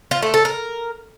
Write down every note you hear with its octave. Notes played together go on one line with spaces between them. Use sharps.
F4
A3
A4
A#4